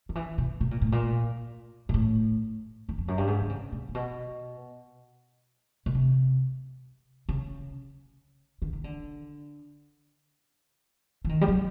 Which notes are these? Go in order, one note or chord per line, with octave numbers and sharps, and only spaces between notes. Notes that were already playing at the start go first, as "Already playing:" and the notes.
D#3
E3
B2
B2
A#2
A2
A#2
A#2
A2
E2
F2
F#2
G2
G#2
D3
C#3
B2
A#2
B2
B2
C3
C#3
D3
D#3
D3
E3
D#3
G3
F#3